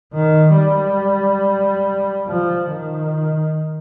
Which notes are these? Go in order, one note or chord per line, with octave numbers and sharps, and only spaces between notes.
D#3
G3
F3
D#3